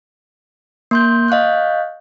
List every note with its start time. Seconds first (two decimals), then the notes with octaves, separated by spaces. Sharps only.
0.91 A#3 C6 G6
1.28 D#5 F5 C#6 F#6 G6